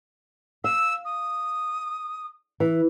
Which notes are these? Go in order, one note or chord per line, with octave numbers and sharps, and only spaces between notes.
F5 E6
D#6
E3